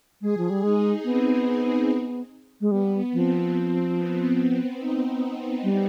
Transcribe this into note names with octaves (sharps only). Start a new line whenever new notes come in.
G#3 G#4
F3
G3
G#3 D#4
B3 C4
G#3
G3 B3
F3 C4
C4
B3
C4
D#4
G3